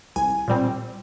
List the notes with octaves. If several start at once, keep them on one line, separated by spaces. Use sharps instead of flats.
C2 G#5
A#2 G3 C4